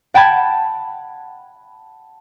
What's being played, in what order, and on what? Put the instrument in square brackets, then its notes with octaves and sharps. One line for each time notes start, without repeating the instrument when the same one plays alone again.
[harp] F#5 G5 A5 B5 G#6